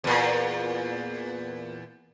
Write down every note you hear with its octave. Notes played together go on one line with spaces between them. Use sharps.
E2 A#2